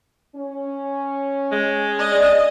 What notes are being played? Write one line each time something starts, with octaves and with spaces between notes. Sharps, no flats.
C#4
G#3
D4 D#5